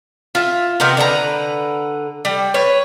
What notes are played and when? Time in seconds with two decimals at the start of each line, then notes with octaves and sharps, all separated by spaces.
0.35 F4 E5
0.80 C3 D#3 B3 A#4
0.97 D3 D4 B4 A#5
2.25 G3
2.54 B4 C#5